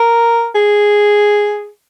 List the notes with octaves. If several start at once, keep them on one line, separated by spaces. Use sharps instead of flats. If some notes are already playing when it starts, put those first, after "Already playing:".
Already playing: A#4
G#4